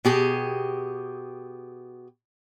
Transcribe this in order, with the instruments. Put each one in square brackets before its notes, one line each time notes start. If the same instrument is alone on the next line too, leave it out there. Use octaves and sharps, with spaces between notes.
[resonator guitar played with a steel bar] B2 G4 G#4